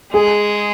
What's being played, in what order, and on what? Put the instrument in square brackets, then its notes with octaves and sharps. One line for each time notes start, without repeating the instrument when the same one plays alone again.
[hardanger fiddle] G#3 [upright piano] G#4